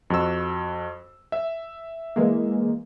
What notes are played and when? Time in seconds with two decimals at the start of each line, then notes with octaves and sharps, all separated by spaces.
0.10 F2 F#4 E6
1.32 E5
2.16 E3 G#3 A#3